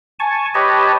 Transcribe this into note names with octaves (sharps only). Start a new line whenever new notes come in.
G#5 A5 C#6
G4 B4 C#5 D#5 A5